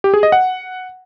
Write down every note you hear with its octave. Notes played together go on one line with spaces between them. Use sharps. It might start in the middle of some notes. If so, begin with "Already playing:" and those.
G4
G#4
D#5
F#5